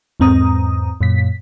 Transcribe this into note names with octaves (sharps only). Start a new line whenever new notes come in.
E2 G#2 C4 A#5 D#6
F#2 A#2 B6